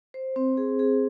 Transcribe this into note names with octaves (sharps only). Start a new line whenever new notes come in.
C5
C4
G#4
G#4